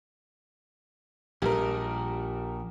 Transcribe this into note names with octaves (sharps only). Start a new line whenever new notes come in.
A#1 A#2 G3 A#4